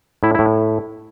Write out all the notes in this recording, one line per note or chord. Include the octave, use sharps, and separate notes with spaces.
A2 E4
A2 E4